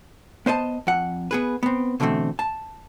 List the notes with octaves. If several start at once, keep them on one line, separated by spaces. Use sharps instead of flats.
B3 C5 D#5 A5
F2 F#5
B3 G#4 B4
B3 C4
B2 D3 E3 A3 C4
A5